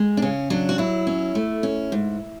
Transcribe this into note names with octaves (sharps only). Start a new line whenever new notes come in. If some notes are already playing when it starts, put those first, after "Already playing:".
Already playing: G#3
D4
C#3 C#4
F#3 D4
F#4
F#3 E4
C#4
A3
C#4
G#2